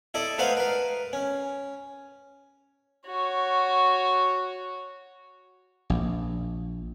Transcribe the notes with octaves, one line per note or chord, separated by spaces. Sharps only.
E4 A4 D5 D#5
A3 D#4 B4 C5 F5 F#5
A#4 B4
C#4
F#4 C#5
A#1